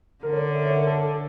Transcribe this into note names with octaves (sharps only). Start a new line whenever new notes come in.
D3 A#4
C#5
D5
E5
C#5
A#4
A4